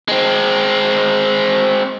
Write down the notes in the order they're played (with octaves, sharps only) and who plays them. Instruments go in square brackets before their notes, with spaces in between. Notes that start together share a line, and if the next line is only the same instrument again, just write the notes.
[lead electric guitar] G#3 C4